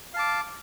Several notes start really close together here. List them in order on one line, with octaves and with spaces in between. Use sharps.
F5 A5 D6